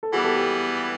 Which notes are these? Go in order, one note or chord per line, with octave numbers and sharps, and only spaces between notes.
A4
E3 G3 B3 F#4 G#4
G4 A4
G4 A4